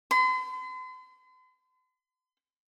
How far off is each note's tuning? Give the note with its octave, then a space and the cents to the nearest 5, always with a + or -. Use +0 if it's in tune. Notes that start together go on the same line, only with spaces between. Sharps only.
C6 -45